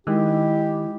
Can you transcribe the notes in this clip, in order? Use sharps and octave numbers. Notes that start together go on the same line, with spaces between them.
D#3 G#3 E4 G4